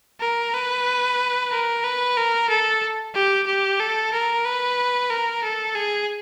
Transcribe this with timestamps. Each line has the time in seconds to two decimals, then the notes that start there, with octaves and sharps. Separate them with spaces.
0.21 A#4
0.54 B4
1.52 A#4
1.84 B4
2.17 A#4
2.49 A4
3.15 G4
3.47 G4
3.80 A4
4.13 A#4
4.45 B4
5.10 A#4
5.44 A4
5.75 G#4